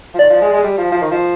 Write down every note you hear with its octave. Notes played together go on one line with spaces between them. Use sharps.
F3
D#3 D5
F3
G#3
G#3
G3
F3
F3
D#3
F3